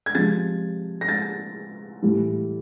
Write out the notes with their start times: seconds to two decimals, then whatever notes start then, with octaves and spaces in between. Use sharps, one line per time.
0.06 G#6
0.15 C3 F3 G#3 A6
1.01 A#6
1.09 A6
2.02 A2 E3 G3